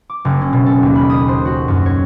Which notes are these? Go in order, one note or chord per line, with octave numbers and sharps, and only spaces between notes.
D6
F#1
C#4
B2
A4
D#2
B5
D#6
C5
F#4
F#2
C#5